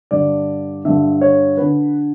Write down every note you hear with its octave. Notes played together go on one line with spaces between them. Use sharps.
G2 D3 D5
G2 D3 E5
C#5
D3 B4